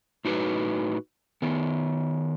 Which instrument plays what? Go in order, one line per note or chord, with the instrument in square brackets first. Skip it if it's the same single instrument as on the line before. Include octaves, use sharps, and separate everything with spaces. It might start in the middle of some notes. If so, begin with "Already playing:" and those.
[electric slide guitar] A2 D#4 F#4 B4
D#3 B3